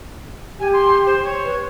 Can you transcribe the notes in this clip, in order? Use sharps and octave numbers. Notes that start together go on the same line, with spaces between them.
G4 G#5
C6
C5
C#5
B4